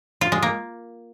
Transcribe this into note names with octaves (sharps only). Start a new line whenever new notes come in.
F4
G#3
A#3